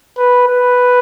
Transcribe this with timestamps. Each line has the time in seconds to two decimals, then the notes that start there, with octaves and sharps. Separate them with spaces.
0.18 B4
0.48 B4